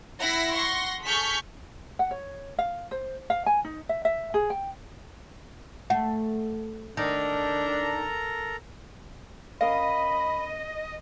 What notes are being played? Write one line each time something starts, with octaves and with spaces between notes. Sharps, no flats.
E4 F#5 B5 A#6 C7
F#5 C6 C#6 A#6
G#4 A4 C#6 F6 G6 B6
F#5
C#5
F5
C5
F5
G#5
D#4
E5
E5
G#4
G5
A3 F#5
D#3 D4 A4 A#4 A#5
C#4 A#4 D#5 F5 B5